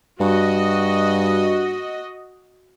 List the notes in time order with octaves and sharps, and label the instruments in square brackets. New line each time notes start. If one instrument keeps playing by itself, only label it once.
[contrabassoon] G2 [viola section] F#4 D#5